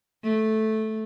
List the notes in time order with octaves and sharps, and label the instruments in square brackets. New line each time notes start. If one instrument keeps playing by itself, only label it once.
[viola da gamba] A3